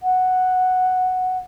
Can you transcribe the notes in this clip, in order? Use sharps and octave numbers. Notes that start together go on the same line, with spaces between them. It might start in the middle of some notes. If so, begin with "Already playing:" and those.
F#5